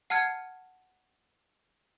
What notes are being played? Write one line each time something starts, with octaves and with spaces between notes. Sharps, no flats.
F#5 A5 F6 G#6 C#7